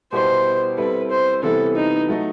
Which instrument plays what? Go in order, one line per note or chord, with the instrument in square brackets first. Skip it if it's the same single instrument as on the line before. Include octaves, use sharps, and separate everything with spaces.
[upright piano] B2 G3 B3 E4 G4 [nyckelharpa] C5
[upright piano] G3 C4 E4 A4 [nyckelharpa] B4
[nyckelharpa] C5
[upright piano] C3 E3 G3 B3 E4 [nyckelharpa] A4
[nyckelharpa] D#4
[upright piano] F#3 A3 D#4